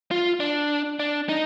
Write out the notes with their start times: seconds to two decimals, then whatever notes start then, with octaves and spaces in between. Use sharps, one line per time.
0.11 F4
0.40 D4
1.00 D4
1.29 D#4